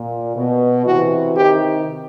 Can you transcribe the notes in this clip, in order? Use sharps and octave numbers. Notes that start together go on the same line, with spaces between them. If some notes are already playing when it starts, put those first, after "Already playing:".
Already playing: A#2
B2
C3 E3 F#4
C3 D#3 G4